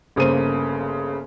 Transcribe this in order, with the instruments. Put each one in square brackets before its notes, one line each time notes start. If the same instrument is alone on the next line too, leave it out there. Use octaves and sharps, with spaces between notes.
[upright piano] G1 C#3 A#3 C5 D#7